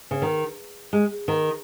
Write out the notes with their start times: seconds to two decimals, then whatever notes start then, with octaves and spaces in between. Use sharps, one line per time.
0.11 C#3
0.22 D#3
0.93 G#3
1.28 D#3